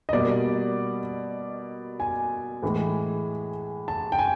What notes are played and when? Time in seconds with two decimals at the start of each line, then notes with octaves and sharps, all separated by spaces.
0.09 D#5
0.13 B2 G3 A#3 D5
2.00 G#5
2.62 A2 E3 G#3
3.88 A5
4.12 G5
4.19 G#5